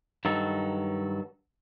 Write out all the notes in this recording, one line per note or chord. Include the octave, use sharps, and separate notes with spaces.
G2 D#3 F#3 A4